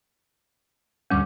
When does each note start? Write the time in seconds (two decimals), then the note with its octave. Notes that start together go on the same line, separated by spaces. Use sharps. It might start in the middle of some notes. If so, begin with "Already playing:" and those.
1.10 D2 G2 G3 C#4 D6